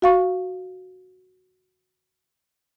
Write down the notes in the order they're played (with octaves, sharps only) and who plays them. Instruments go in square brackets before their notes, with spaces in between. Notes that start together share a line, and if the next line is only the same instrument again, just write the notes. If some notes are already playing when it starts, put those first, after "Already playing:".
[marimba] F#4 F5 C#6